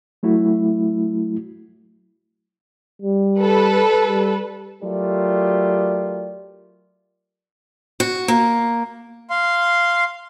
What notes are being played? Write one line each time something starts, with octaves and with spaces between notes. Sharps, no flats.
F#3 A3 E4 F#4
G3
A4 B4
G3
F#3 A3 F4 G4 A#4 D5
F#4
A#3
F5 C6